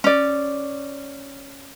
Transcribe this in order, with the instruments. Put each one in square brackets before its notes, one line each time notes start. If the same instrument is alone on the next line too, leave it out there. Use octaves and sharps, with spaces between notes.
[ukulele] C#4 D5